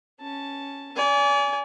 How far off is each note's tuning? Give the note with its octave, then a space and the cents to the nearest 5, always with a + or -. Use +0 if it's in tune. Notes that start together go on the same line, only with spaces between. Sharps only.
C#4 +0 A5 +0
D5 -40 G#5 +0